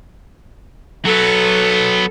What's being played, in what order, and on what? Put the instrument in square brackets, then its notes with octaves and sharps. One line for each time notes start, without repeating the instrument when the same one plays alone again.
[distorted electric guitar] F#3 B3 [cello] A4